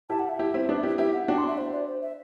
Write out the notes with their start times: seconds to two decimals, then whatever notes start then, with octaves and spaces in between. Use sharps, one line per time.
0.10 E4 G4 A5
0.19 F#5
0.29 E5
0.39 E4 G4
0.54 C4 E4
0.69 B3 D4
0.83 E4 G4
0.98 E4 G4 E5
1.13 F#5
1.28 D4 F#4 G5
1.38 C6
1.48 E5
1.58 C5
1.72 D5
1.87 C5
2.02 E5